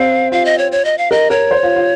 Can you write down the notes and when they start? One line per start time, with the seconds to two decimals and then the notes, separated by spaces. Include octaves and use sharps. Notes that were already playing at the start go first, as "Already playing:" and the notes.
Already playing: C4 F5
0.32 F4 F5
0.45 D#5
0.58 C#5
0.72 C#5
0.85 D#5
0.98 F5
1.11 A#4 D#5
1.30 A#4 C#5
1.51 C5
1.63 F4
1.76 F4